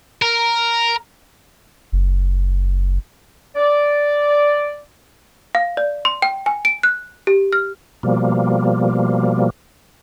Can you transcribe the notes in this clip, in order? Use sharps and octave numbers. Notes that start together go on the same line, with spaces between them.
A#4
F#1
D5
F5
D5
C6
G5
G#5
D7
F#6
G4
F6
B2 F3 G3 A#3